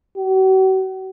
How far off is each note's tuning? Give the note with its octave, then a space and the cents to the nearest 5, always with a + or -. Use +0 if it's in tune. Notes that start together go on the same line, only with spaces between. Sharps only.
F#4 +45